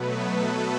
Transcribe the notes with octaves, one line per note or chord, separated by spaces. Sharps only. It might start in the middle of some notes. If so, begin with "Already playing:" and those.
Already playing: B2 F#3 A3 B3 B4
A3 A4